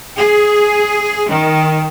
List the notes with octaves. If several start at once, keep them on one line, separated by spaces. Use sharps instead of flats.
G#4
D#3